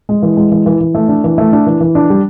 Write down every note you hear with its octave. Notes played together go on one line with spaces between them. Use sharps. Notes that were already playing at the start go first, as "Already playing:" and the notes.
G#3
E3
G#3
E3
E3
E3
A3
D4
E3
A3
D4
E3
E3
D4
G3